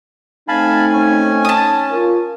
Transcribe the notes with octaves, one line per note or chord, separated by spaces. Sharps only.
A3 C4 D#4 F5 G#5 A5 B5
C#4
A5 D#6
F4 A#4